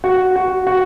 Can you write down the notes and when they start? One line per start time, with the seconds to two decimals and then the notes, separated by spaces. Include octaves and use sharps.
0.04 F#4
0.36 F#4
0.67 F#4